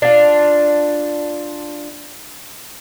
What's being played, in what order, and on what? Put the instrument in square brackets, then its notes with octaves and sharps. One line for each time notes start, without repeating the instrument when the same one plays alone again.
[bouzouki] D4 F4